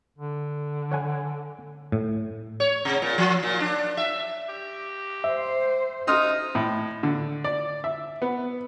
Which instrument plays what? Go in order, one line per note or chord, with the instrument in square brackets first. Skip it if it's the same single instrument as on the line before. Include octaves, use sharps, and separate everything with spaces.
[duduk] D3
[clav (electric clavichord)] C#5 F#5 G#5
A2
[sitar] C#5
C3
A#2
F3
A#2
D4
E5
[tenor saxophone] G4
[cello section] C5 [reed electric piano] E5
[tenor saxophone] D#4 [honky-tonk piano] C6 D#6 F6
[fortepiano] A2
D3
D5
E5
B3